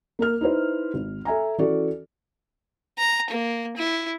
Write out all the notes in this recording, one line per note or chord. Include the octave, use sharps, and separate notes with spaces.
A#3 A#4 F6
D#4 E4 B4 C5
G#1
A4 E5 G#5 A#5
E3 C#4 F#4 A4 D5
A#5
A#3
E4